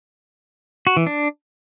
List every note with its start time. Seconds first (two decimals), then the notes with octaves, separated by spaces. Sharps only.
0.87 F#4
0.97 E3
1.07 D4